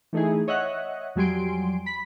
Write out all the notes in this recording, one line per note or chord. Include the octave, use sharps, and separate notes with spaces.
E3 A3 D#4 E4 G#4
C#5 D#5 E5 F#5 F#6
F2 F#3 G3 G#5 C6 D7
B5 B6